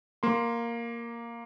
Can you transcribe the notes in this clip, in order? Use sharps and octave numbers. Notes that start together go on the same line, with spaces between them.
A#3 C6